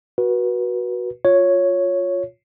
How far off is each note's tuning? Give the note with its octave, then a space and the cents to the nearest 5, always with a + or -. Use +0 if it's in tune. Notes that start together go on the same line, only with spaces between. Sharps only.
F#4 +0 B4 -30
F4 +15 C#5 +0